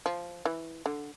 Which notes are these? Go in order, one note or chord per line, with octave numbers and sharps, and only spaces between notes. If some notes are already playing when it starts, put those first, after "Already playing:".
F3
E3
D3